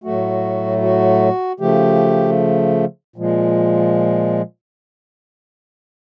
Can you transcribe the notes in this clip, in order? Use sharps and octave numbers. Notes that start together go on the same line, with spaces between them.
A2 F#3 A3 F#4
F#4
C#3 F3 A3 G4
A#2 F3 G#3